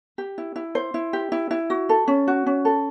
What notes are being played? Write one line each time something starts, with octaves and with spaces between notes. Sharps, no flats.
G4
E4
E4
C5
E4
G4
E4
E4
F#4
A4
C#4
F#4
C#4
A4